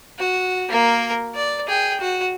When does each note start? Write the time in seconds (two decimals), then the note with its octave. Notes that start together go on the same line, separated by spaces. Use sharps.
0.19 F#4
0.69 A#3 A#4
1.35 D5
1.68 G#4 G5
2.01 F#4